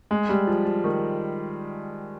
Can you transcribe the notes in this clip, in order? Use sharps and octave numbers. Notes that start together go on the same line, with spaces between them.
G#3
G3
F3
F3
D#3